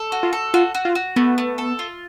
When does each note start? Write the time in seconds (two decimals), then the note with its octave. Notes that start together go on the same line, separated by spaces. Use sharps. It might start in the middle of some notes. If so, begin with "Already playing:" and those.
Already playing: A4
0.12 F#4
0.23 F4
0.33 A4
0.54 F4 F#4
0.75 F#4
0.85 F4
0.95 F#4
1.16 A3 B3
1.38 A3
1.58 A4
1.79 F4